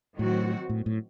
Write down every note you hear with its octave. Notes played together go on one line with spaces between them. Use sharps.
A2 D#3 F#3 C4 F#4
A2
A2